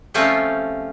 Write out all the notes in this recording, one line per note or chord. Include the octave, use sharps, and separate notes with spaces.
F3 G3 A3 C4 C#4 F4